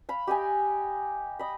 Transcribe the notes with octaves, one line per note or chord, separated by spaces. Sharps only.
F5 B5
G4 D#5 G5 G#5
D#5 B5